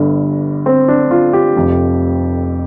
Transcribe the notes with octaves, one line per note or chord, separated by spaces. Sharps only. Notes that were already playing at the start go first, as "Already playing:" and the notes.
Already playing: G1 G2 D3
C4
D4
F4
G4
F1 F2 F3